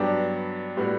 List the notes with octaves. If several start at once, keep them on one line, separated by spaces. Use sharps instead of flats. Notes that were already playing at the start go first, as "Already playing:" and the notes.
Already playing: G2 F#3 B3 D4 G4
A2 G3 B3 F#4